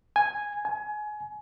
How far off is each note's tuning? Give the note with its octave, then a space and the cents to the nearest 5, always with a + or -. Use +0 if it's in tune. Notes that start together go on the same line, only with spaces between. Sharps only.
G#5 -5
G#5 +25